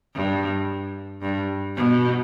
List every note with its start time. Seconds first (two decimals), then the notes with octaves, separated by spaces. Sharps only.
0.15 G2
1.22 G2
1.76 B2